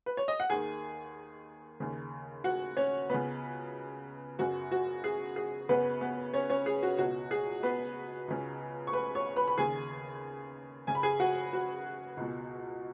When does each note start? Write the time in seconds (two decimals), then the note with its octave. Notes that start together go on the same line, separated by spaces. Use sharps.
0.06 B4
0.17 C#5
0.28 D#5
0.40 F#5
0.50 D#2 D#3 G#4 G#5
1.80 D#2 C#3
2.44 F#4 F#5
2.77 C#4 C#5
3.09 C#2 C#3 B3 B4
4.39 F#2 C#3 F#4
4.71 F#4
5.04 G#4
5.36 G#4
5.69 F#2 C#3 B3 B4
6.01 B3 B4
6.34 C#4 C#5
6.50 C#4 C#5
6.66 G#4
6.83 F#4
6.98 C#2 B2 F#4
7.31 G#4
7.63 B3 B4
8.28 C#2 C#3
8.87 C#6
8.93 B4 B5
9.15 C#5 C#6
9.36 B4 B5
9.48 B5
9.58 D#2 C#3 G#4 G#5
10.87 F#2 C#3 G#5
10.95 B5
11.03 G#4 G#5
11.20 F#4 F#5
11.53 F#4
12.17 C#2 B2